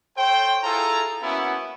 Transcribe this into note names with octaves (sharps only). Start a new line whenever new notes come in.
A4 C5 C#5 G5
E4 F4 G#4 A4 G#5 A#5
A#3 B3 C#4 E4 F#4